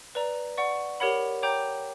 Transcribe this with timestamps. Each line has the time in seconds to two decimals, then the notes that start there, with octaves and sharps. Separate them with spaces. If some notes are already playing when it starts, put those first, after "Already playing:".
0.15 B4 D5 A#5
0.58 D5 F#5 C#6
1.00 G4 A#4 C#5 F#5 B5
1.43 C#5 G5 A#5 D6 G6